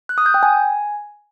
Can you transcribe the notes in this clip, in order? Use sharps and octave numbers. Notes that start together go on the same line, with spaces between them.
F#6
D#6
G6
G5
G#5